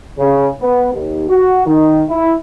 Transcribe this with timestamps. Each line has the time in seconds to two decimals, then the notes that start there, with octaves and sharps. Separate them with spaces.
0.19 C#3
0.61 B3
0.93 D#2
1.29 F#4
1.66 D#3
2.09 E4